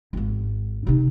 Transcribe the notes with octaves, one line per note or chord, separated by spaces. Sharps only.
G#1 G#2
C3 D#4